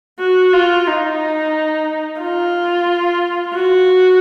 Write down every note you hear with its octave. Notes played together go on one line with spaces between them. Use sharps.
F#4
F4
D#4
F4
F#4